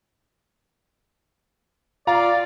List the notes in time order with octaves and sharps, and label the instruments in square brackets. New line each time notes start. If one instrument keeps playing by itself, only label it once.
[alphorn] F4 [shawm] D5 [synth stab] F5 [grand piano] A#5